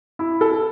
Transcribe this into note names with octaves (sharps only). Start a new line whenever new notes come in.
E4
A4